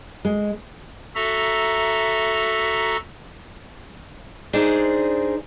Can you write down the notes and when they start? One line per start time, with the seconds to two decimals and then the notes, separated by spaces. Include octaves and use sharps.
0.25 G#3
1.15 F#4 A4 E5 A#5
4.53 D4 D#4 G#4 C5 D5